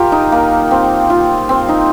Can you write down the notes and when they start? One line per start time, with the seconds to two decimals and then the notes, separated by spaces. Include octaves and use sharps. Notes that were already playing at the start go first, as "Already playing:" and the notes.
Already playing: F4 G4 A#4
0.12 D#4
0.32 A#3
0.71 C4
1.10 F4
1.49 C4
1.68 D#4